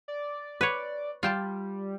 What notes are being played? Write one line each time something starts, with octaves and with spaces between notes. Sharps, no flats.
D5
B4 C#5
G3 F4 G5 A5